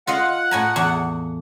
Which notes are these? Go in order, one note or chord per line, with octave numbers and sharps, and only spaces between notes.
F4 D#5 F5 F#5
A2 G#5 A#5
E2